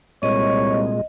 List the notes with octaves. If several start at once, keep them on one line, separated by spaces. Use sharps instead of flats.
C2 A#2 G#3 C#5 D#5